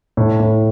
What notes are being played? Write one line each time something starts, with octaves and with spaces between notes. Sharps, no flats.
A2
A2